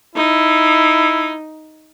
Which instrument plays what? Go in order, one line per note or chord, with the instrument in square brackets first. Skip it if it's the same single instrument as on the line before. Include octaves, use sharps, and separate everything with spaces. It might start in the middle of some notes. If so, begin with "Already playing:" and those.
[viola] D#4 [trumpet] E4